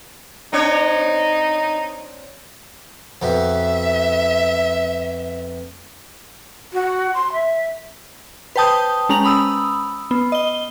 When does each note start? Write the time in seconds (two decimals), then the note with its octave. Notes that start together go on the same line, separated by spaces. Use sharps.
0.53 C4 D4 D#4 C#5
3.22 F2 B2 E5
6.73 F#4
7.14 C6
7.32 E5
8.56 B4 C5 G5 A5 D#6 G6
9.09 G#3 C#4 A#5 F7 F#7
9.25 B5 D#6 E6
10.11 B3
10.32 D#5 G7